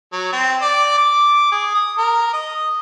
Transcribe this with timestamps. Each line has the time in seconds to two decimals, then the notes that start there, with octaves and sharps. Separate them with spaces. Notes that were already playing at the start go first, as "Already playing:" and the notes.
0.12 F#3
0.32 C4
0.62 D5
0.98 D6
1.52 G#4
1.74 D#6
1.98 A#4
2.33 D#5